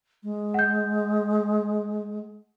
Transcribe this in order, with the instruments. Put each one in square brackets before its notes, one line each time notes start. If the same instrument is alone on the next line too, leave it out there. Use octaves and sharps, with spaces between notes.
[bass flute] G#3
[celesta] F#5 G6